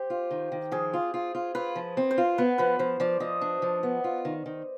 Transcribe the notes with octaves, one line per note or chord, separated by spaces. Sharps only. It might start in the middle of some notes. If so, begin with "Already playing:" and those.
Already playing: G4 C5
F4
D#3
D#3
F3 G#4
F4
F4
F4
F4 B4
F3
C4
C5
F4
B3 B4
F3 B4
F3 C5
F3 D5
F3 D#5
D4
F3
B3
F4
D#3
D#3